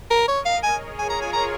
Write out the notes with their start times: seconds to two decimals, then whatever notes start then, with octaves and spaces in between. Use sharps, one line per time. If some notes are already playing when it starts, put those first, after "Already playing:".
0.11 A#4
0.28 A#4 C#5 D#5
0.45 F5
0.63 G#4 C#5 G#5
0.98 F4 A#4 G#5
1.10 A#5
1.22 G#5
1.33 A#5